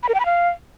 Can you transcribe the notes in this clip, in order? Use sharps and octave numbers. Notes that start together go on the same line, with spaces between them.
B5
A#4
G5
B5
F5